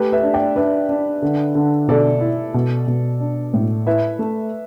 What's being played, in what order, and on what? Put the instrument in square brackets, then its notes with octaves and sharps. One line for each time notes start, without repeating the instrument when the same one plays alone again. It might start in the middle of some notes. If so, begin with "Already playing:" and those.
Already playing: [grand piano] A3 [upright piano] G4 B4
[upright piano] B4 E5
[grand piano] D4
[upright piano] D5 G5
[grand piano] D4 [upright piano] B4 E5
[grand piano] D4
D3
D3
[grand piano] B2 [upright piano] A4 D5
[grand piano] E4
B2
B2
D4
A2
[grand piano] E4 [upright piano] B4 E5
[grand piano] A3